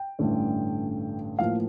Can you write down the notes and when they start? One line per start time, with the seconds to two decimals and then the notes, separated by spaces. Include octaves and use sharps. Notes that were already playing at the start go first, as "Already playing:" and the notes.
Already playing: G5
0.19 A1 G2 D3 A3 C#4
1.39 A1 A2 F3 A#3 F5